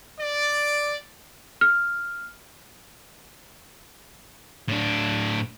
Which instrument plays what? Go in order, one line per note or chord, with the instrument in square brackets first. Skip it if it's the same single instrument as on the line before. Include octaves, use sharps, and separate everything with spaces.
[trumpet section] D5
[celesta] F6
[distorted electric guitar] A2 D4